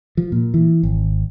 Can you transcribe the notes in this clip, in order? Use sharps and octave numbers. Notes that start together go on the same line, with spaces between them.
F3
A#2
E3
G#1